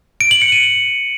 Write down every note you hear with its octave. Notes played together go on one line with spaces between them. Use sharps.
D7
F#7
C#7
D#7